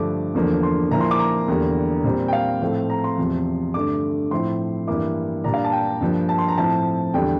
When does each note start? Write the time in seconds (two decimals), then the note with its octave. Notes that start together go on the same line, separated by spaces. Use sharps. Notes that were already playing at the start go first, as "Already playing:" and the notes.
Already playing: G2 D3 F3 A3 D6
0.35 E2 D3 F3 A#3
0.63 C6
0.91 A#2 F3 A#3 E4 A#5
1.01 C6
1.11 D6
1.19 A#5
1.48 E2 D3 G3 A#3
2.04 A#2 G3 C4
2.28 G5
2.33 F5
2.61 A2 F3 A3 C4
2.90 A#5
3.04 C6
3.17 E2 C3 F3
3.74 G2 D3 A3 D6
4.31 A2 F3 C4 E4 C6
4.87 G2 E3 A#3 E4 D6
5.44 A#2 G3 D4 A#5
5.54 F5
5.64 A5
5.72 G5
6.01 G2 F3 A#3
6.29 A5
6.38 C6
6.48 A#5
6.57 A2 F3 C4 E4 A5
7.14 E2 D3 G3 G5